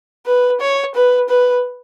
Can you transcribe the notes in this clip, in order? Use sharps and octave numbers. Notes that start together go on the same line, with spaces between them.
B4
C#5
B4
B4